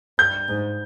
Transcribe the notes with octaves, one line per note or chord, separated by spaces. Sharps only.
G2 G6
G#2